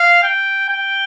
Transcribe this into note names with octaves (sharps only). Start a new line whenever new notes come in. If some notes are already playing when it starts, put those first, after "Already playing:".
Already playing: F5
G5
G5